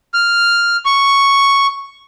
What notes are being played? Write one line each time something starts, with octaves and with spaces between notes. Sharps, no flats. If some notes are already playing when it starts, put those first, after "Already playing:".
F6
C#6